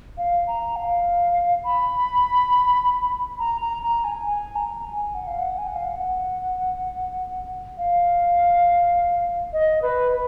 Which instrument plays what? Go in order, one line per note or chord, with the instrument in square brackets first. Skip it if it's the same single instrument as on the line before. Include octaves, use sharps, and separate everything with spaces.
[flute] F5
A#5
F5
B5
A#5
A#5
A#5
G#5
G#5
A#5
G#5
F#5
F5
F#5
G#5
F#5
F5
F#5
F5
D#5
B4
B4